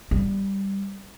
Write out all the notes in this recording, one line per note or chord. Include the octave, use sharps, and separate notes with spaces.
G3